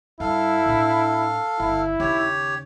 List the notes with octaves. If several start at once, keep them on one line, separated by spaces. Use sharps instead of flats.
G2 E4 A4 F5
A2 D4
G1 E4
D#2 C#3 G4 C#5